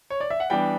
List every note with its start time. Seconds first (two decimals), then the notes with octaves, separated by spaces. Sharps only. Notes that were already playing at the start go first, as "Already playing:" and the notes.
0.10 C#5
0.20 D5
0.30 E5
0.40 F#5
0.50 E3 G3 B3 D4 G5